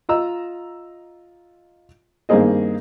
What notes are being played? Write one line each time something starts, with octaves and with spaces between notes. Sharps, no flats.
F4 D#5 A#5 E6
G2 D#3 A#3 C4 G#4 D#5